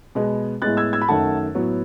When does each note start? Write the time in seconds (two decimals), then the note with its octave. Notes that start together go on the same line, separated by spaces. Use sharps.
0.15 B2 G#3 B3
0.62 A2 G#3 B3 F#6 A6
0.77 E6 G#6
0.93 E6 G#6
1.02 B5
1.08 F#2 D#3 A3 F#5 A5
1.55 A2 F#3 B3